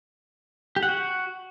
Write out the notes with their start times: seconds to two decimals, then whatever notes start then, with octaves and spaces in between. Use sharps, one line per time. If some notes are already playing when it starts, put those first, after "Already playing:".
0.76 G4
0.83 F#5
0.89 F#4